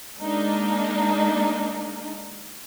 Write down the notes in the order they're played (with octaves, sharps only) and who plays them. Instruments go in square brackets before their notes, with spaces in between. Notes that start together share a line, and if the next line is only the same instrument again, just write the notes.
[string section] G#3 A#3 D4 D#4